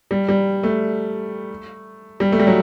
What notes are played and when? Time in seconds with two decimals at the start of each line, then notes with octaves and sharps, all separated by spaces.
0.11 G3
0.29 G3
0.63 A3
2.20 G3
2.32 A3
2.39 G3
2.47 F#3